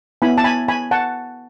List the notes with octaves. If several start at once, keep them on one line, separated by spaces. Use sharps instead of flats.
B3 E4 G#5 B5
A5
G#5 B5
G#5 B5
F#5 A5